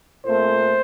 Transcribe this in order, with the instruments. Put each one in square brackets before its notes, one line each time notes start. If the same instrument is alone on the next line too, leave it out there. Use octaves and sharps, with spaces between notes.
[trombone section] A#2 A3 C4 C5